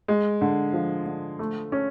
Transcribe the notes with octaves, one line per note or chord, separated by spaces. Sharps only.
G#3
D3
F3
D3
A3
C#4